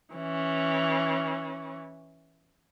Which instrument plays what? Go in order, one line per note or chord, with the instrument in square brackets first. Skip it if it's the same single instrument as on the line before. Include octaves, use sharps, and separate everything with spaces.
[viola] E3 C#4